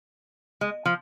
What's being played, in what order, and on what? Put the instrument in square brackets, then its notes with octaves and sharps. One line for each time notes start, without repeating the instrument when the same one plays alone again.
[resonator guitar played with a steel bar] G#3
F3